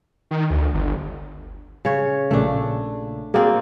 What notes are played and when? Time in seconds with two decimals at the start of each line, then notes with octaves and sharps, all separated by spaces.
0.31 D#3
0.50 D2
0.74 G1
1.85 C#3 C#5
2.31 A#1 A#2 C#3 A3 D4
3.34 A#3 C4 F#4 G#4 D5